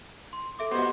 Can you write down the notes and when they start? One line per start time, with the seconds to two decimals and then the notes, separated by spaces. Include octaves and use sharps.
0.33 C6
0.59 A4 E5 D6
0.72 B3 F#4 G4 C5 D#5